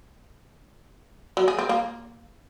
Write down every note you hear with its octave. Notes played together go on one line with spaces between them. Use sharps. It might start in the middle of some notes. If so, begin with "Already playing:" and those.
F#3
G#4
C4
A#3